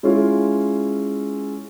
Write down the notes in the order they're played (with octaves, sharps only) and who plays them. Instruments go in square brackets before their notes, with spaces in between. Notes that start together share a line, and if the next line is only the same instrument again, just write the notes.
[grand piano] G#3 C#4 E4 F4